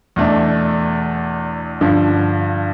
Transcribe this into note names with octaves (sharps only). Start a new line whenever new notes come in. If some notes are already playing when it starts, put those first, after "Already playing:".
E2 B2 A3 D4
G2 D3 F3